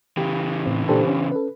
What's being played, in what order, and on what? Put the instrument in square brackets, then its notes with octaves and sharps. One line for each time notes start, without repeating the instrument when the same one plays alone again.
[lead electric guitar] C#3 E3 [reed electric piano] G4
[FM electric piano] A2 C4
[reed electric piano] A#2 A4 [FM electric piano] D4 G4 C5
[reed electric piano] C#4
[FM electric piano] A4 B4